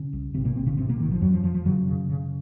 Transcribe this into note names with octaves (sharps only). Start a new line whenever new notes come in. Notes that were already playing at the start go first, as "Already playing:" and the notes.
Already playing: C#3 C#4
C2
G#1 C3 C4
A#2 A#3
G#1 C3 C4
C#3 C#4
G#2 C3 C4
A#2 A#3
G#1 D#3
F3
F1 F#2 F#3
F3
F1 F3
F3
F#2 C#3 F#3
C#3
C#3